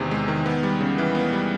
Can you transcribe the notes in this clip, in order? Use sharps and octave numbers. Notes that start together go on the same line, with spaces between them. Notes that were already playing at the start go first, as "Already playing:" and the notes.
Already playing: E2 C3 D#3 G#3
G#3
D#3
B3
G3
C#3
E3
B3
G3